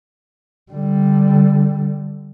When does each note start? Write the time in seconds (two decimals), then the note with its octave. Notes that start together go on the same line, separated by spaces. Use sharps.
0.72 D3 G3